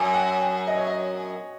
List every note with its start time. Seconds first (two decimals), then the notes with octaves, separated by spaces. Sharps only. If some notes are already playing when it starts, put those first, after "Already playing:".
Already playing: F#2 G#5
0.14 F#5
0.40 F#5
0.67 D#5
0.77 C#5
0.87 D#5